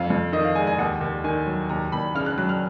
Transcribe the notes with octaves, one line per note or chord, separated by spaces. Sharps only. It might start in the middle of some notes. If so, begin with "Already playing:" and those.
Already playing: F2 F5
F2
D#3 D#5
F5
G#3 G#5
G#5
D#2 F#5
D#2
D#3 G#5
F#3
D#2 A#5
D#2 B5
C#3 F6
F#6
F#3 F#6
F6